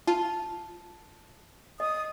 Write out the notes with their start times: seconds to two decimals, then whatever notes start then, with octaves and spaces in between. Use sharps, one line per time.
0.07 F4 A5
1.80 D#5 D#6